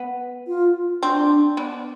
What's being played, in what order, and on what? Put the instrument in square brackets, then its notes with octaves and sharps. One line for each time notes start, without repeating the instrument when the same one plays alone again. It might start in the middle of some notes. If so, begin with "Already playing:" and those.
Already playing: [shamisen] B3
[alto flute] F4
[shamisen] C4 [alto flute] D4
[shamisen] B3 D4